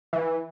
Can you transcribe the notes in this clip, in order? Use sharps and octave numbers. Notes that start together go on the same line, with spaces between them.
E3